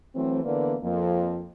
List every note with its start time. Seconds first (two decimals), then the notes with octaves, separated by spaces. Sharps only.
0.15 E3 F#3 A3 C4
0.44 D3 E3 A#3 B3 B4 D5
0.84 F2 F3 A#3